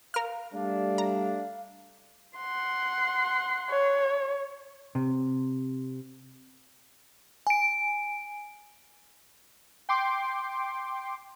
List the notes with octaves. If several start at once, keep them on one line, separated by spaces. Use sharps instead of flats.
A#4 F5 F6
G3 A3 D4 F5
A#5
F#5 C6
C#5
C3
G#5 D7
G5 C6 D6